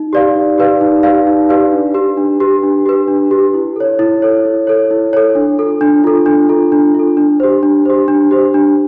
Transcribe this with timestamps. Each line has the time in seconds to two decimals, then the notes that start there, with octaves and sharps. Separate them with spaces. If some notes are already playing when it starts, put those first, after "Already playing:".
Already playing: D#4
0.13 G4 B4 D5 F5
0.36 D#4
0.58 G4 B4 D5 F5
0.81 D#4
1.03 G4 B4 D5 F5
1.27 D#4
1.49 G4 B4 D5 F5
1.72 D4
1.94 G4 B4
2.17 D4
2.40 G4 B4
2.63 D4
2.86 G4 B4
3.08 D4
3.31 G4 B4
3.54 E4
3.76 A4 C#5
3.99 E4
4.22 A4 C#5
4.45 E4
4.67 A4 C#5
4.91 E4
5.13 A4 C#5
5.35 D4
5.58 F4 A4
5.81 D4
6.04 F4 A4
6.26 D4
6.49 F4 A4
6.72 D4
6.94 F4 A4
7.17 D4
7.40 G4 C5
7.63 D4
7.85 G4 C5
8.08 D4
8.31 G4 C5
8.54 D4